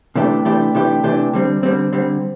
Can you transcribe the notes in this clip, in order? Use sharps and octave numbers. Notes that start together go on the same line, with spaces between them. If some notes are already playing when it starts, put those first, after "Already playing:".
C3 E3 A3 D4 G4
C3 E3 A3 D4 G4
C3 E3 A3 D4 G4
C3 E3 A3 D4 G4
D3 G3 C4
D3 G3 C4
D3 G3 C4